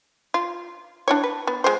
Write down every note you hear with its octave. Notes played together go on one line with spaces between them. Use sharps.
F4
D4 E4 C#5
B4
B3
G#3 F4 C5